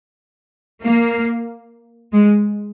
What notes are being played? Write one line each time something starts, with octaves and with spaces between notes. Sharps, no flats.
A#3
G#3